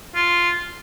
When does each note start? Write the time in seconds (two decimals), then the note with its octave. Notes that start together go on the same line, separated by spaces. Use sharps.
0.15 F4